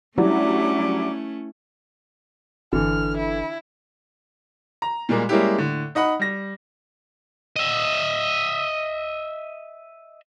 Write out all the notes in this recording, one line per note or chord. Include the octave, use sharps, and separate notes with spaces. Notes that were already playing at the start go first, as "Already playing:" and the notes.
F#3 G3 A3 C#4 D4 E4 E5 D6
G1 D3 E3 F6
E4
A#5
A#2 G3 G#3 A#3
G3 G#3 A#3 C#4 E4 G4
A2 D3
D#4 D#5 F#5 B5
G3 A#6
D#5 E5